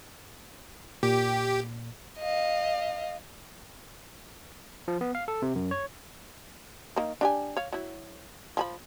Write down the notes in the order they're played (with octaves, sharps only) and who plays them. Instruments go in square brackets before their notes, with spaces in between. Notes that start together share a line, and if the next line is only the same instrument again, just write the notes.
[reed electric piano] A#2 [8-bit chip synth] G4
[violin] D#5 F5
[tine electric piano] F3
B3
F5
A4
C3
F#2
C#5
[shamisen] D#3 A#3
D4 G4 G#5
C#5 F5
F#3 E4
F3 G#5 B5